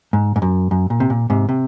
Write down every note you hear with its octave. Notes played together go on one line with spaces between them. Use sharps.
G#2
G#2
F#2
F#2
A#2
C3
A#2
G#2 C3
C3